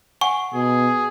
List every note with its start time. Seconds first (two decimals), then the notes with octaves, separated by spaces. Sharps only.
0.21 F#5 G#5 C#6
0.54 B2 G#4